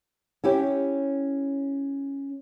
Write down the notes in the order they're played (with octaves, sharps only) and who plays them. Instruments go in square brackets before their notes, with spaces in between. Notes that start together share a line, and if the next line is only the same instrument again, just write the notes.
[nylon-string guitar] C#4 E4 G4 C#5